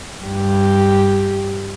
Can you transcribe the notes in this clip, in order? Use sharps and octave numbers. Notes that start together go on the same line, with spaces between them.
G2 G4